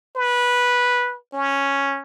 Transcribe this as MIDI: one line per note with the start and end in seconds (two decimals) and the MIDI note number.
0.17 1.17 71
1.34 2.03 61